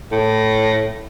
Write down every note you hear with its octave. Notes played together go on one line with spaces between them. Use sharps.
A2